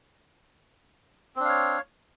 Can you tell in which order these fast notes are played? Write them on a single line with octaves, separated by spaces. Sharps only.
C4 D4 F5 C#5